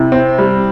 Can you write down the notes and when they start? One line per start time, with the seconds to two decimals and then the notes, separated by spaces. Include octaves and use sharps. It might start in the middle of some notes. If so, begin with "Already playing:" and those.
Already playing: C3 E4
0.12 C4
0.38 G3